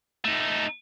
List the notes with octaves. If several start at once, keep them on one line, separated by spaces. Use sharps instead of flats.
A3 D#4